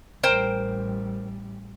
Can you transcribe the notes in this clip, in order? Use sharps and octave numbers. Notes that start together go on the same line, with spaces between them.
A1 G3 A#4 C5 G5